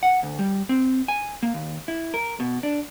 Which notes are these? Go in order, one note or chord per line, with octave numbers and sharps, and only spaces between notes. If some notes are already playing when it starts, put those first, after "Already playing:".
F#5
D2
G3
C4
G#5
A#3
D#2
E4
A#4
B2
D4